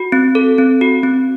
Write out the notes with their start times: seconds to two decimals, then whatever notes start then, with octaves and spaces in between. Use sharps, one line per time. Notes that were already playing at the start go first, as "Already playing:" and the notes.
Already playing: F#4
0.12 C4
0.35 A4
0.58 C4
0.81 F#4
1.03 C4